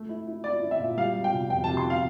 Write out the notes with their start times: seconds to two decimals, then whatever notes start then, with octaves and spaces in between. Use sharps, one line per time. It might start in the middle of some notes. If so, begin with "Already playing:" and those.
Already playing: A3
0.09 E4
0.27 E4
0.44 E4 D5
0.62 E4
0.71 E5
0.80 A#2
0.97 G3 F5
1.15 G3
1.24 G5
1.33 C3
1.50 F2 G5
1.64 A5
1.68 C3
1.77 C6
1.90 F5